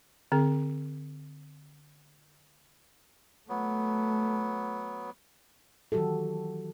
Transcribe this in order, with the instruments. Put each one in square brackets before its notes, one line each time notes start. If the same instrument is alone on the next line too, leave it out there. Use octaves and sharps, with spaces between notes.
[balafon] D3 C4 G#4
[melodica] F#3 B3 [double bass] A3
[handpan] D#3 E3 F#3 F#4 G4 A4